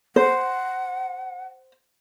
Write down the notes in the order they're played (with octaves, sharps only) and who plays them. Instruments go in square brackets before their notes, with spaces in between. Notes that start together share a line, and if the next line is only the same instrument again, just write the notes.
[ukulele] C5 [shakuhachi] F#5